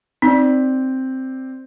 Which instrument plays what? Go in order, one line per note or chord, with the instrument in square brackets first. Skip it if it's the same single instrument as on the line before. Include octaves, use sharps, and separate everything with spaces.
[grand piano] C4 D5 [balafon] D#4